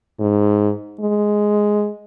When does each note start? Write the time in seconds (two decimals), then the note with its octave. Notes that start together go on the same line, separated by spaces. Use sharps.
0.20 G#2
1.00 G#3